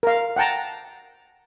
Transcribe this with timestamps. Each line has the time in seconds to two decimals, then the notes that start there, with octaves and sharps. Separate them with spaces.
0.03 A#4 F5
0.36 F#5 G5 A5 A#5